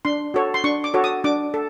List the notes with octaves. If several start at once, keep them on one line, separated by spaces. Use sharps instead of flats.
D4 C6
F#4 A4 C#5
C6
D4 C#6
D6
F#4 A4 C#5
D#6
D4 D6
A4